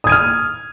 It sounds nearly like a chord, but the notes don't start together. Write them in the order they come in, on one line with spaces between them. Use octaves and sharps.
D#6 G#6 D#7 F6